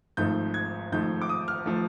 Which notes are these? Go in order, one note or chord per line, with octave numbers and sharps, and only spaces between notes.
G#1 G#2 F3 A3 G6
G#6
G#1 G#2 F3 A3 G6
D6
D#6
F6
F3 A3